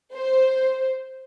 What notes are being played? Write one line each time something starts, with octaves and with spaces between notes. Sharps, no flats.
C5